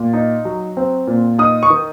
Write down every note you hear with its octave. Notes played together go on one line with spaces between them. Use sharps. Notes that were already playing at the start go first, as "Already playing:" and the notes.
Already playing: A#2
D#4
F#3
C4
A#2
D#4 D#6
C#6
D#3